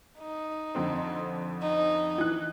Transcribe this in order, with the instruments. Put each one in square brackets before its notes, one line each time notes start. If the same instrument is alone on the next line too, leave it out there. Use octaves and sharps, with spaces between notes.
[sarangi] D#4
[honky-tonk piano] F2 D3 C4
[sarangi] D#4
[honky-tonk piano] E3 F#6